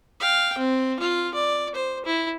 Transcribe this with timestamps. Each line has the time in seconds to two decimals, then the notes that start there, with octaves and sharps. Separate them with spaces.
0.20 F5 G5
0.58 C4
0.99 F4
1.34 D5
1.75 C5
2.06 E4